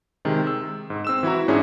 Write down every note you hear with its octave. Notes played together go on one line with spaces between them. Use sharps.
C3 D#3 G#3
E6
G#2
C4 E6 E7
E3 E4 F#4 A#5
G#2 C#4 D4 E4 G#4